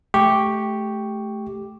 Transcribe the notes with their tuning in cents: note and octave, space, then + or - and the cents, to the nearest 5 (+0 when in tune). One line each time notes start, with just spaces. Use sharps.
A3 -20 G4 +0 C#6 +0